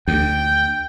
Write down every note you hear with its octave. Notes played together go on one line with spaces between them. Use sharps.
D2 G5